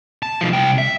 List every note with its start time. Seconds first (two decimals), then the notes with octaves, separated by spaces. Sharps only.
0.23 A5
0.41 B1 F3
0.53 C2 G5
0.78 E5